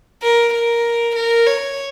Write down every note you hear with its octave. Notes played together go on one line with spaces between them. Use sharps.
A#4
A#4
A#4
C#5